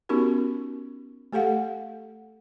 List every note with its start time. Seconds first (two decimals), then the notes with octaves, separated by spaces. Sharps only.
0.09 B3 C#4 D#4 F#4 G4 A#4
1.33 A3 G4 A4 F5 F#5